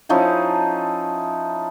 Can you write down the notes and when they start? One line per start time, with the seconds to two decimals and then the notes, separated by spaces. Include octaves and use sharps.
0.09 F3 C#4 D#4 E4